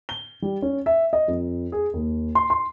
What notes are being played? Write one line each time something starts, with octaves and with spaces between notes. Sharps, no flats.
G7
G3
C#4
E5
D#5
F2
G#4
D#2
C6
C6